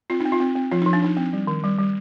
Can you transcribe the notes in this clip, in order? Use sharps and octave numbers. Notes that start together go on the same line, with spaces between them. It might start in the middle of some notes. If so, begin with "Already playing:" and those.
C4 F4
C4 D#4
F4
C4
C4
F3 F4
F3 D#4
D4
F3 D#4
C4
G3
D#3
G3
G3